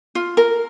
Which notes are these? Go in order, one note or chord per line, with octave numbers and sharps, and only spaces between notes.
F4
A#4